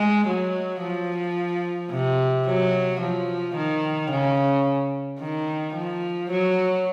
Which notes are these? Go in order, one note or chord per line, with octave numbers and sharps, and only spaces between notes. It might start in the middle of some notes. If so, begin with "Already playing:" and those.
Already playing: G#3
F#3
F3
C3
F#3
F3
D#3
C#3
D#3
F3
F#3